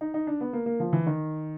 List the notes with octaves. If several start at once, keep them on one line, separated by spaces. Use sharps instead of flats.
D#4
D#4
D4
B3
A#3
A#3
F3
E3
D#3